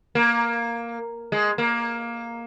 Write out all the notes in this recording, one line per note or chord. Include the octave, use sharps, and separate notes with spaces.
A#3
G#3
A#3